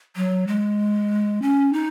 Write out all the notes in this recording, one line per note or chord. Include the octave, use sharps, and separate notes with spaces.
F#3
G#3
C#4
D#4